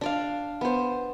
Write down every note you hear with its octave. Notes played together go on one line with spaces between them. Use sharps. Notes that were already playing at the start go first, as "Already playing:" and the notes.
D4 D5 F5
B3 C5